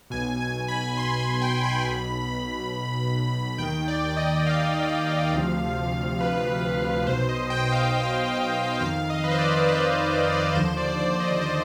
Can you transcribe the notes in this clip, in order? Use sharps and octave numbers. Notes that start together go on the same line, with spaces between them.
B1 B2 G#5
G#5
B5
C6
B5
G5
B5
B1 B2
D#2 D#3 G5
D5
D#5
F5
D2 C3 F3
B4
B1 B2 C5
D#5
G5
F5
F2 D#3 F5
D#5
B4
C5
D5
B4
B4
C5
D5
D#2 D3 F3 C5
D5
D5
D#5
C5